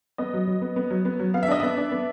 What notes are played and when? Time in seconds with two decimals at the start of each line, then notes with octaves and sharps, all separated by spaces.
0.18 B3 D#5
0.33 F#3
0.47 F#3
0.61 B3
0.76 B3
0.90 F#3
1.05 B3
1.19 F#3
1.34 B3 F5
1.43 E5
1.48 D4 D#5
1.60 B3 E5
1.77 D4
1.91 B3